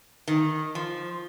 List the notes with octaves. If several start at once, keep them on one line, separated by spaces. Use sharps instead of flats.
D#3
F3